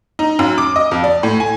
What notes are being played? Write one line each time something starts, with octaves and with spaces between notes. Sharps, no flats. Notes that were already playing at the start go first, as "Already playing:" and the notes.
D#4
F#2
D6
D#5
F2
D5
A2
G#5